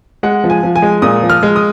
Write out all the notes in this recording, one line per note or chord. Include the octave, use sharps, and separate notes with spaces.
G#3 F#5
F3
G#5
F3
G#5
G#3
A#2 D#6
F3
F6
G#3
D#6